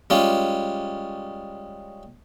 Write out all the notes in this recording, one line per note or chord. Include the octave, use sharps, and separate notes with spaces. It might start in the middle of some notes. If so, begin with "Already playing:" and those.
G3 G#3 C#4 F4